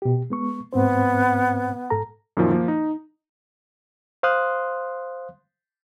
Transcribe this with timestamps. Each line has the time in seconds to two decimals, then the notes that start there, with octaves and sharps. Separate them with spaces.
0.02 B2 G4
0.30 G#3 B3 C#6
0.73 G#2 B3 C4 C5
1.90 G#2 A4 A#5
2.37 F#2 A#2 D#3 F3
2.51 F3 A#3
2.68 D#4
4.23 C5 F5 C6 D#6 F#6